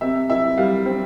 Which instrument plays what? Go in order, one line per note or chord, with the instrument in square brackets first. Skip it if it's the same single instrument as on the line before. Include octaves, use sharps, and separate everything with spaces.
[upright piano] C3 E5
E4 E5
G3 F5
C4